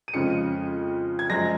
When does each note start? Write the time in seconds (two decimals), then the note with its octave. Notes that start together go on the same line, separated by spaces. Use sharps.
0.08 D#7
0.14 F2 C#3 F3 G#3 C#7
1.19 G#6
1.30 F#2 F3 G#3 A#6